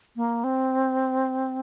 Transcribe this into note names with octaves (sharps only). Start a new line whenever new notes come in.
A#3
C4